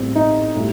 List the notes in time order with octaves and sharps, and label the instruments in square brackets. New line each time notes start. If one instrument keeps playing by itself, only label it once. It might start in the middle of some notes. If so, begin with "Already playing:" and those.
Already playing: [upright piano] A2 G3 C4
D#4
A2 G3